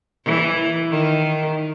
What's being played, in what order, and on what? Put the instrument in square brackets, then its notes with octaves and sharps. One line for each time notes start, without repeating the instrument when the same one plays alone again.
[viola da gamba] E3
D#3